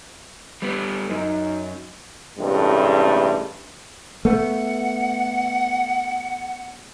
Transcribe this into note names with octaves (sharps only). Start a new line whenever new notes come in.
G3 B3
F#2 D#4
A1 G2 C3 G#3 A3
A3 B3 F#5